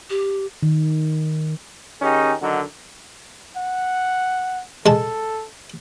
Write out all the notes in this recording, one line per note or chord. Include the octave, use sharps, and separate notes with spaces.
G4
D#3
D#3 C#4 D#4 G4 G#4
D3 D#3 F#3 D#4
F#5
G#3 A4 A5